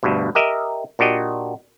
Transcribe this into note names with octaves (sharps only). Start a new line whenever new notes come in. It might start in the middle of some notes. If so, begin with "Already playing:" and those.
D2 G2 B2
G4 A#4 D#5 E5
A#2 D4 F#4 G4 D#5